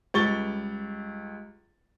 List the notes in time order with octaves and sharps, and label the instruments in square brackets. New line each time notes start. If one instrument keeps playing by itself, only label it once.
[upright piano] C#2 G3 C#6 A6 G7